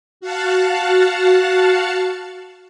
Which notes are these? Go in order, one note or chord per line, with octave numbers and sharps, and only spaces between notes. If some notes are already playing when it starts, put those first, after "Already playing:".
F#4 F5 F#5 A5